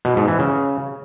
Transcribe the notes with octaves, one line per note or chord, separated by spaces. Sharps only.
B2
G#2
E3
C#3